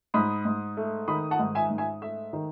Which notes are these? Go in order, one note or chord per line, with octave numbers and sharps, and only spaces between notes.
G#2 B5 D#6
G#2
A3
D#3 B5 D#6
F#5 A5
G#2
E5 G#5
G#2
E5 G#5
A3 E5
D#3